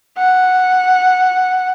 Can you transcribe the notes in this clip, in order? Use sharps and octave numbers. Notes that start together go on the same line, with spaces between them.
F#5